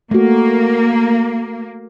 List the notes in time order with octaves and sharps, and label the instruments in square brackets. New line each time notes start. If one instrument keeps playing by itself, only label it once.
[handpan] A3 F#4 [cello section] A#3